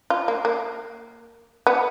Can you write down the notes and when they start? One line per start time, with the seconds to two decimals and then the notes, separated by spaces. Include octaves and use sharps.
0.10 F4
0.28 A#3
0.45 A#3
1.67 B3